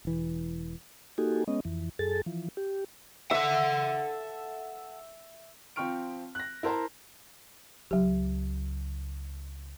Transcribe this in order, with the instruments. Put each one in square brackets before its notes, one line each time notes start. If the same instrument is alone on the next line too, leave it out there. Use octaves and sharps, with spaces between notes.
[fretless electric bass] E1 E3
[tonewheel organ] A#3 D#4 F#4 G4 A4 G#5
G#3 B3 C#4 D#5
F2 E3
F#2 G#4 A4 A6
E3 F3
G4
[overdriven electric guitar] A4 F#5 [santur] E5
[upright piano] F3 C4 G5 C#6 F6 D7
F#6 A#6
E4 A#4 C5 A5 A#5
[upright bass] C#2 [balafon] F#3 G4